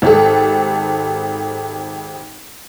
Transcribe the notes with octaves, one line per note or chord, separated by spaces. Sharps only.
G#1 G4 A4